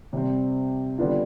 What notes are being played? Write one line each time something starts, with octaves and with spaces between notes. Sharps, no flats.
C3 G3 C4
D3 G3 B3 D4 F4